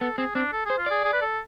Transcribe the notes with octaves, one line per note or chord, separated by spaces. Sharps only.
B3 A4
C4 G#4
C4 D4
A4
G#4 C5
F4
G#4 D5
G#4
B4
A4